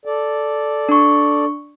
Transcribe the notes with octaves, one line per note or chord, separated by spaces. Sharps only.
A4 D5
D4 C#6